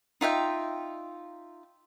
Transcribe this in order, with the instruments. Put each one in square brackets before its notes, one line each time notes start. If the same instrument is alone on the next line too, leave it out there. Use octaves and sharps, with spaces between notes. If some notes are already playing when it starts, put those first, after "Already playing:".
[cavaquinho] D#4 F4 E5 G5